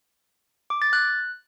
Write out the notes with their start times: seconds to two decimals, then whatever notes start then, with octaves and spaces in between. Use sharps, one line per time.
0.70 D6
0.82 A6
0.93 F#6